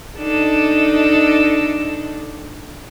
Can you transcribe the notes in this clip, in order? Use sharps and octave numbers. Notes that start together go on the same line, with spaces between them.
D4 D#4 A4